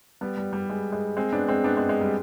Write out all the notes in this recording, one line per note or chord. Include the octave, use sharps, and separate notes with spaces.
G3 B3
G3
G3
G#3
G#3
G#3 C4
B3 D4
G#3 C4
B3 D4
G#3 C4
G#3
G3